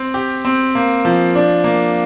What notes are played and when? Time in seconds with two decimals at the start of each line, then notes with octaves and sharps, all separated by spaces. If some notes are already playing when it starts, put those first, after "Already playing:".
Already playing: C4
0.14 G4
0.45 C4
0.75 A#3
1.05 F3
1.35 D4
1.64 A#3